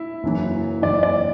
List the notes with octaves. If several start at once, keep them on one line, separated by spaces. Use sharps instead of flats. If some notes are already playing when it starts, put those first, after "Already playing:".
Already playing: E4
F#1 F#2 E3
F#1 F#2 E3 D5
D5